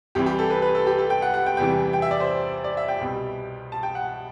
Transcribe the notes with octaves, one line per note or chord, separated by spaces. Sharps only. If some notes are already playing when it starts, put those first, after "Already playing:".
C2 C3 E3 G3 G4
G4
A4
B4
B4
A4
G4
A4
G5
F#5
F#5
G5
E2 C3 E3 G3 G5
G5
E5
D5
C5
D5
E5
G5
C2 B2 G3
A5
G5
F#5